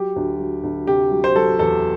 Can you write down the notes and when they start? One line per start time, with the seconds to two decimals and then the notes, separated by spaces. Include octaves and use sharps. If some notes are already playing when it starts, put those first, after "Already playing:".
Already playing: F#3 G4
0.16 D2
0.39 F#3
0.63 D2
0.87 C3 G4
1.11 F#3
1.24 C5
1.35 F#3 A4
1.59 E2 A4